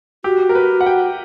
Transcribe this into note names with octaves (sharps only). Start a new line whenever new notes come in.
F#4 G4
A#4
B4
F#5
G5